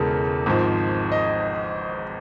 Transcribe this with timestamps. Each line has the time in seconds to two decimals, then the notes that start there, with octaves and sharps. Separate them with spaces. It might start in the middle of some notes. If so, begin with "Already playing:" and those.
Already playing: E1 E2 C#3 G#3 A4 A#4
0.46 G#1 G#2 F3
1.12 D#5